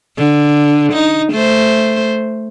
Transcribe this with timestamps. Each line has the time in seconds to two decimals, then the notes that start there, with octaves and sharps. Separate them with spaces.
0.18 D3
0.93 D#4
1.32 A3 C5